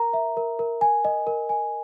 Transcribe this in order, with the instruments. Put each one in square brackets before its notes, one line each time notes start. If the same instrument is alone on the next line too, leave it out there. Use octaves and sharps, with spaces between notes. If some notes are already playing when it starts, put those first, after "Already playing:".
Already playing: [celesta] A#4 A#5
E5
A#4
A#4
G#5
D#5
A#4
G#5